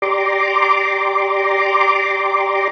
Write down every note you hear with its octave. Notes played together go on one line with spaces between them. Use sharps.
G4 D5 A#5 C6 D6